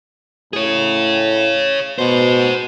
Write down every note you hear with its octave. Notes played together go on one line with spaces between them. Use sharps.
A2 G#4 C#5
B2 G#4 C5